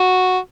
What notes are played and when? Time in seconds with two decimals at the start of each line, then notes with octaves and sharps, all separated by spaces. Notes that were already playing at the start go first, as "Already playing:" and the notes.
Already playing: F#4